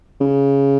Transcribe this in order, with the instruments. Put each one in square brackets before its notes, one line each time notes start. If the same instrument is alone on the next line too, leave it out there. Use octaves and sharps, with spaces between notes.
[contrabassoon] C#3